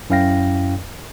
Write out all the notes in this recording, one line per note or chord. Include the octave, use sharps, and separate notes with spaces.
F#2 C#4 E4 F5 G5 A#6